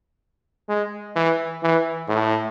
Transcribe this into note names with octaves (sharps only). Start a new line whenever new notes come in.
G#3
E3
E3
A2